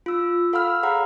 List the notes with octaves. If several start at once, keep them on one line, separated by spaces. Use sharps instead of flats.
F4 E6
A4 F5 F#5 B5 E6 F6
G#4 C#5 F5 F#5 A#5 B5